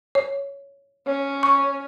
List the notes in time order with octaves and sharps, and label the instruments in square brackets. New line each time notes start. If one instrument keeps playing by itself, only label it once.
[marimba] C#5
[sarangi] C#4
[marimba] C#6